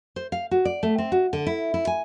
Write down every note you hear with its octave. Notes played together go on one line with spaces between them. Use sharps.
C5
F5
F#4
D5
A3
C4
F#4
D3
E4
E4
G#5